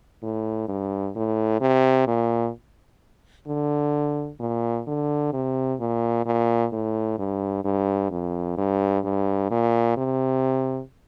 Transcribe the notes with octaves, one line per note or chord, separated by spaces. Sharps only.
A2
G2
A2
C3
A#2
D3
A#2
D3
C3
A#2
A#2
A2
G2
G2
F2
G2
G2
A#2
C3